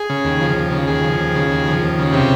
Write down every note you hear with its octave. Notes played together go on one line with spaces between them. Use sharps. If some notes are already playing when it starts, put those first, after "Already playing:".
Already playing: G#4
C#3
D#2
F3
D#2
C#3
D#2 G#4
F3
D#2
C#3
D#2
F3
D#2
C#3
C3 G4